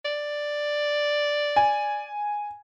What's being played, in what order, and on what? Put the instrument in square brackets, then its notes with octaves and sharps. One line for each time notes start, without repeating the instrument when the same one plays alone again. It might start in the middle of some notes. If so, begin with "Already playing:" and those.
[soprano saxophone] D5
[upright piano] G#5